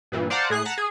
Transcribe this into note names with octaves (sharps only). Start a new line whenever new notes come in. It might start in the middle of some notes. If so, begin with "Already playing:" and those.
G2 A#2 E3
C5 D5 F5 F#5 A5 A#5
A2 G#4 F#6 C7
F#5 A5 A#5 A6 B6
G#4